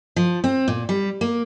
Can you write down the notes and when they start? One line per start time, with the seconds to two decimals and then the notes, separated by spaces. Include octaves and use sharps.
0.16 F3
0.44 C4
0.68 A#2
0.89 G3
1.21 A#3